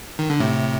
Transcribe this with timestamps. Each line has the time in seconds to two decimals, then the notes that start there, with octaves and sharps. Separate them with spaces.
0.19 D#3
0.30 D3
0.40 A2 C3